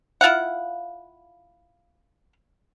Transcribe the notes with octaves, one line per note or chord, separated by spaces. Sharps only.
E4 F4 F5 F#5